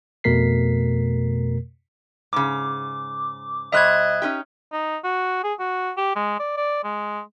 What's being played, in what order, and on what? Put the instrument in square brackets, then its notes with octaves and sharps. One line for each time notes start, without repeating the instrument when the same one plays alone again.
[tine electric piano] F2 B2 A3 A#4 B6 C7
[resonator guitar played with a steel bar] G#2 C#3 [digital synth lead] D6
[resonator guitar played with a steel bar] B2 G3 C5 [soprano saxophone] D#5 [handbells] E5 F#6 G#6
[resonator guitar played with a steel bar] C#4 D#4 G4
[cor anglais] D#4
F#4
G#4
F#4
G4
G#3
D5
D5
G#3